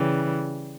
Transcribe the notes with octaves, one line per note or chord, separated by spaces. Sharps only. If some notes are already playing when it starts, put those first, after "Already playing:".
Already playing: C#3 E3 G3